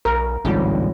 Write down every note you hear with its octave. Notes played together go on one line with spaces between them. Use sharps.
B1 A#4
A1 D2 G#2 G3 C4 F4 C#5